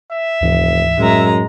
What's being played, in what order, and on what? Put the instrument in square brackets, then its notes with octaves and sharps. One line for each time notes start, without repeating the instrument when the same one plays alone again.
[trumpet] E5
[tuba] F1 [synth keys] D2 G#2 E3
[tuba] F#2 [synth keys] A2 [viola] G#3 A#5